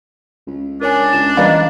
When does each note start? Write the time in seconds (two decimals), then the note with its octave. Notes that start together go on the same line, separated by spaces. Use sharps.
0.47 C#2
0.81 D4 A#4 C#5 G#5
1.13 C#2 E7
1.37 E3 G3 A#3 D#5 A#5 B5